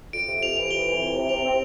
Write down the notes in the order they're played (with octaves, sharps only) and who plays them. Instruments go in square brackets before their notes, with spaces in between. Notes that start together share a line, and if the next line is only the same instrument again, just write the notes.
[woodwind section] F2 [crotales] D7
[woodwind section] C3
[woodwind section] F2 [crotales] F7
[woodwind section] E3 [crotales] F7
[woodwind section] F2 [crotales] G7
[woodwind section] E3
C3
C3
[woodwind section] C3 [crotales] F7
[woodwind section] C4